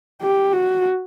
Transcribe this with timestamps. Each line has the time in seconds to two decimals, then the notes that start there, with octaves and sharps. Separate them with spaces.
0.22 G4
0.53 F#4